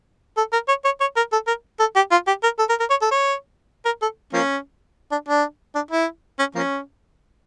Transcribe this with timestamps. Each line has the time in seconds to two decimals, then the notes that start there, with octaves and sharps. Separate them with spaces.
0.37 A4
0.53 A#4
0.68 C#5
0.85 C#5
1.01 C#5
1.16 A#4
1.32 A4
1.47 A#4
1.80 A4
1.96 G4
2.11 F4
2.27 G4
2.43 A#4
2.59 A4
2.69 A#4
2.80 A#4
2.90 C#5
3.02 A4
3.11 C#5
3.85 A#4
4.02 A4
4.33 F3 A#3 C#4
5.12 D4
5.29 D4
5.75 D4
5.91 E4
6.39 C#4
6.55 F3 A#3 C#4